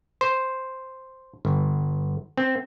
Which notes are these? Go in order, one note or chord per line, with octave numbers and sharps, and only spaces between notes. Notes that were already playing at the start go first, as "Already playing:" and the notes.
C5
G1
C4